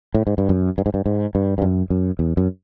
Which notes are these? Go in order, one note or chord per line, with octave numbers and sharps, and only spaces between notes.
A2
G#2
G2
F#2
G2
G#2
G2
G#2
G2
G2
F#2
F#2
E2
F#2